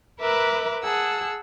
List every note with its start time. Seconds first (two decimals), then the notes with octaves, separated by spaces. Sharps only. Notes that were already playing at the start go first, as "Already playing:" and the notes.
0.19 A#4 B4 E5 D6 E6 F#6
0.81 G#4 F#5 A5 E6